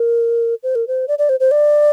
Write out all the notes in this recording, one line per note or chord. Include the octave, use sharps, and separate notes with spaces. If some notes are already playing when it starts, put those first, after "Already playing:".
Already playing: A#4
C5
A#4
C5
D5
D5
C5
C5
D5